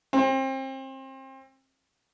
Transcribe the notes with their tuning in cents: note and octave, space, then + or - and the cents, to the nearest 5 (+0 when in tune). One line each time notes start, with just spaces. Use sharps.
C4 +30